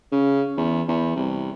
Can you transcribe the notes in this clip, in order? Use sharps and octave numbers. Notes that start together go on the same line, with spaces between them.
C#3
E2
E2
C2